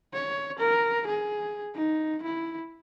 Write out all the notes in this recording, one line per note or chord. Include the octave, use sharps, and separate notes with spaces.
C#5
A#4
G#4
D#4
E4